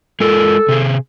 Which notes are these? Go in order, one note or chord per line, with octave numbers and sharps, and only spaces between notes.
G#3 F4 A4 A#4
C3 G#4